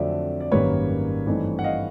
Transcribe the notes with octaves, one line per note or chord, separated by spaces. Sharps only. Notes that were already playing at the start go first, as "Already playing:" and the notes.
Already playing: F2 D3 F#3 A3 C4 D5 E5
D5
G#1 F#2 D#3 G3 A#3 B4 C#5
G2 E3 A3 C4 D#4
F#5
D#5 F5